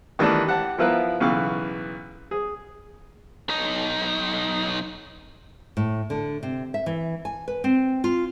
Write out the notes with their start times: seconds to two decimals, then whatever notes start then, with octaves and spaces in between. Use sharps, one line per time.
0.19 D#3 E3 G3 A3 D4
0.47 G4 F#5 A5
0.78 F3 B3 E4 F4 A#4 B4
1.20 B1 C#3 E3 F5
2.31 G#4
3.49 B1 D#4
5.77 A2
6.10 D3
6.43 C3
6.74 E5
6.86 E3
7.25 G#5
7.48 B4
7.64 C4
8.04 F4